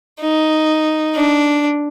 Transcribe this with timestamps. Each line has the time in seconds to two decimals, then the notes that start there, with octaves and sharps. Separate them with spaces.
0.21 D#4
1.16 D4